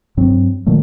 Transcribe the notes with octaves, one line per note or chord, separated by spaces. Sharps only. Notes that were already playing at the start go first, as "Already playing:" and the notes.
G2 F#3 C4
A#2 D#3 F#3 A3